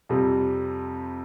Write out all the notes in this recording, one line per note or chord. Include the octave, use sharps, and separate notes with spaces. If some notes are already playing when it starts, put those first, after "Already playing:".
F2 C3 G3